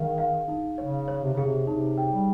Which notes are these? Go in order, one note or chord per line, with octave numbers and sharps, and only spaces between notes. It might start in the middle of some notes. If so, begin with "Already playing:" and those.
Already playing: D#3 G#4 F5
F5
D#4
C#3 C#5
C#5
C3
C#3 G#4
C3
C3 D#4
G5
G3